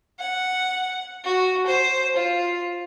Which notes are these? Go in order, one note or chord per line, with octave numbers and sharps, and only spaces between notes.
F#5
F#4
C5
F4